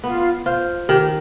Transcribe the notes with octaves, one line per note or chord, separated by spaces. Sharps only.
B3 F4
F4 C5
D#3 G4